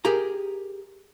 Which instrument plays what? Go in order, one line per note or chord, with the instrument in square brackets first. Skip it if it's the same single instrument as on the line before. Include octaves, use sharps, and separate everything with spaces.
[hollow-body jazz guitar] G4 G#4 A#4 A#5